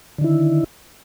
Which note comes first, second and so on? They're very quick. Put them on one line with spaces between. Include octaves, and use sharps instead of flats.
D3 D#3 E4